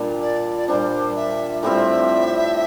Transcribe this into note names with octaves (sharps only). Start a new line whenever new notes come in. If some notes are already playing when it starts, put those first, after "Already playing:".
Already playing: A#2 G3 D4
D5
D5
A#2 G3 D4 C5
E5
A2 G3 C4 F4 E5